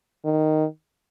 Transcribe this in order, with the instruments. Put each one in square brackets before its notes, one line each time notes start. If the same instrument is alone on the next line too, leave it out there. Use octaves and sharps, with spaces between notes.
[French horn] D#3